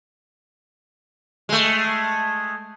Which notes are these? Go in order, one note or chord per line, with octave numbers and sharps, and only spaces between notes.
G#3 A3